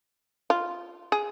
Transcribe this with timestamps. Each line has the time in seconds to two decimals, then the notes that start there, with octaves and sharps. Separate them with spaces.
0.50 F4
1.12 G#4